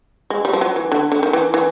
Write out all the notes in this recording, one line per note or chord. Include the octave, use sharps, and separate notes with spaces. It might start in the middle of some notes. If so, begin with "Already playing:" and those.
G#3
G3
F3
F#3
E3
D3
D3
D#3
E3
E3